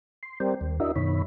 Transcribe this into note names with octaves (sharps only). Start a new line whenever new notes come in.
C6
G3 C4 A#4 C5 D5 G5
D#2
D4 E4 F#4 A#4 D#5 E5
F#2 B2 D#3 C#5 B5